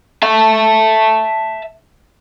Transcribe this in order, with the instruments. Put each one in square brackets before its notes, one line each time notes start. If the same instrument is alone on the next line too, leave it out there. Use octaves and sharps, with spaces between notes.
[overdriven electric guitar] E5 A5